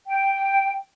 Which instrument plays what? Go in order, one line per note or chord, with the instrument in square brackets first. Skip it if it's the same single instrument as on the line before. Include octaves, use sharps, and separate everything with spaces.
[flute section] G5